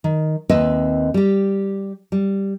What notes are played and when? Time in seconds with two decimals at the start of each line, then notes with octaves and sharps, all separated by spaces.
0.04 D#3
0.49 D#2 C4 B4 D#5 E5
1.14 G3 G4
2.12 G3